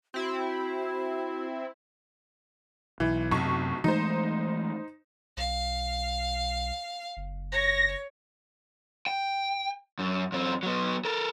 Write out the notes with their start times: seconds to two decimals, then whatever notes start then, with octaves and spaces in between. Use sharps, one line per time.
0.14 C4 E4 F#4
3.00 B1 E3
3.31 B1 F#2 C3 C#6
3.84 E3 G#3 A3 D#4 C5
5.37 B1 F5
7.17 F#1
7.52 C#5 A#6
9.07 G5
9.99 F#2
10.32 F#2 C4
10.63 F#3 B3
11.05 A4 A#4